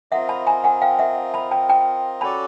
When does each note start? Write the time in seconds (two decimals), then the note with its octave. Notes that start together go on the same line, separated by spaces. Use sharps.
0.11 C4 F4 A#4 D#5 E5 F#5
0.29 A5 B5
0.47 G#5 A#5
0.64 F#5 G#5
0.82 F5 G5
0.99 E5 F#5
1.34 A5 B5
1.51 G5 A5
1.69 G5 A5
2.21 C#4 F#4 A4 D5 A5 B5